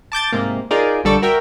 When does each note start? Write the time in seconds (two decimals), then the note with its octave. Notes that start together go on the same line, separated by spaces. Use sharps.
0.12 A5 D6 G6 A6
0.33 G#2 C3 A#3
0.71 D#4 F4 G#4 A#4 D5
1.04 A#1 D3 G3 A4 D5 C#6
1.22 F#4 A#4 E5 G5